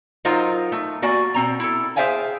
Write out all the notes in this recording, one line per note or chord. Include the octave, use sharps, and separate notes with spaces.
F#3 D#4 F4 A#4 C5
A3
A#3 F#4 D5 G#5
B2 C4 A#5
E4 A4
G#4 C5 E5 F5 G5 G#5